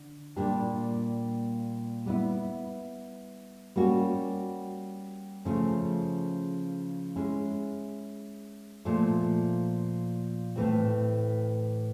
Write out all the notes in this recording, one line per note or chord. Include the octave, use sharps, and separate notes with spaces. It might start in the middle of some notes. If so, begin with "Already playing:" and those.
Already playing: D3
A#2 G3 A#3 D4 G4
G3 B3 E4
G3 A#3 C#4 F#4
C#3 F3 A3 C#4
G#3 C#4 E4
A#2 F3 A3
A2 E3 A3 C4